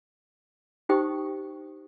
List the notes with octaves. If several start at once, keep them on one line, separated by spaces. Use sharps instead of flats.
D#4 G4 C5 G5 C#6 D#6